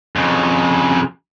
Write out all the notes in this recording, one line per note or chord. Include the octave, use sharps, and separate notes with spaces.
F2 C#3